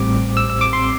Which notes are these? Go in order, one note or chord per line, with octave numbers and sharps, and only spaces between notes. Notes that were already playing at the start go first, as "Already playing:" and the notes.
Already playing: A1 A2 G3 C4 D6
E6
E6
D6
C6